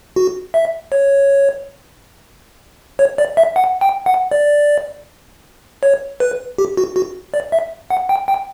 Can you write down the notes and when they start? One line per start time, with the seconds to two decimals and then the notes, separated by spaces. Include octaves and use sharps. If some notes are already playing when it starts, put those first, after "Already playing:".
0.16 F#4
0.54 E5
0.92 C#5
2.99 C#5
3.18 D5
3.37 E5
3.56 F#5
3.81 G5
4.06 F#5
4.31 D5
5.83 C#5
6.20 B4
6.58 G4
6.77 F#4
6.96 F#4
7.34 D5
7.52 E5
7.90 F#5
8.09 G5
8.28 G5